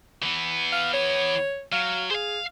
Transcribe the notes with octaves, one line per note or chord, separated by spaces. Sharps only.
E3 B3
F5
C#5
F#3 F5
G#4 C5 F5